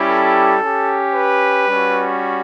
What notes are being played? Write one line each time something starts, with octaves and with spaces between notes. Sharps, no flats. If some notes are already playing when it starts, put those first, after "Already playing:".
Already playing: G3 C#4 E4 G4
A4
C#4 G4
B4
G3 C#4 F#4